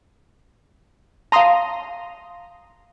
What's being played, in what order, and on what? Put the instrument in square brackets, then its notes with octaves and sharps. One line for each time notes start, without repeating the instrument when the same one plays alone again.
[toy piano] F5 A5 [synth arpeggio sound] A#5 C6 D#6